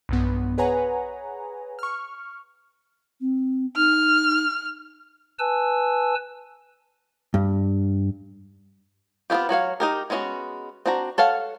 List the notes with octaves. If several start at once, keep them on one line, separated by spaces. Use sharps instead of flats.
B1 G2 B3
G#4 B4 C#5 F#5 G#5 A#5
C#6 F6
C4
D#4 F6
B4 G#5 A5 E6
G2
B3 C4 E4 F4 G4
F#3 F#4 C#5 F5
D#4 G4 A#4
G#3 B3 C#4 E4 F#4
C4 D4 F#4 A#5
A4 C#5 F5 F#5 A5